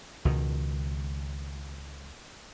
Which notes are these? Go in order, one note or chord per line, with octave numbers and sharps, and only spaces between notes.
C#2 B2 D#3